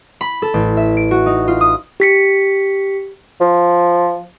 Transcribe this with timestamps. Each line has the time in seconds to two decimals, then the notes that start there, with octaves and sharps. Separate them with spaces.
0.21 B5
0.42 A4
0.54 A1
0.77 E5
0.97 D7
1.11 F#4
1.26 D#4
1.48 F4
1.61 D#6
2.00 G4 B6 C#7
3.41 F3